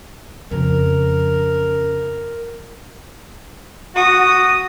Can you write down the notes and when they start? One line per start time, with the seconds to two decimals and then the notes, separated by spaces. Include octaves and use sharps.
0.51 F2 C#3 A#4
3.96 F#4 D#6